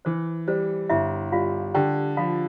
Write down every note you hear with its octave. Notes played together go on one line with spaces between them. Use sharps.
E3 C5
G3 C5
G1 E4 E5
G3 F4 F5
D3 G4 G5
F3 F4 F5